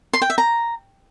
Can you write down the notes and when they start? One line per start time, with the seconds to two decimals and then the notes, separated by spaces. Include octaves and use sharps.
0.13 C6
0.22 G5
0.30 E5
0.38 A#5